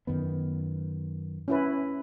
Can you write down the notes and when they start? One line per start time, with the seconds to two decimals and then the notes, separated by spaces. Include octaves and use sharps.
0.07 F#2 D#3 B3
1.48 C#4 E4 B4